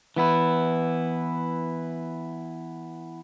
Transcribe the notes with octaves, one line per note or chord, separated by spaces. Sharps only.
E3 B3 E4